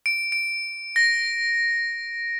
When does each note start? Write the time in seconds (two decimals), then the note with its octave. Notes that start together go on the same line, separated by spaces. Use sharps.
0.06 D7
0.32 D7
0.96 A#6